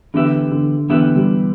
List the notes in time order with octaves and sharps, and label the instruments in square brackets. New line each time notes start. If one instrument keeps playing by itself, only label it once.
[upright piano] D3 [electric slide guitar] E3 B3 G4 B4 E5
[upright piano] D3
[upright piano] D3 [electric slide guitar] E3 B3 G4 B4 E5
[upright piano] G3